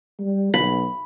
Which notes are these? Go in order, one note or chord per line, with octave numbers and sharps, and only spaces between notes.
G3
B1 B5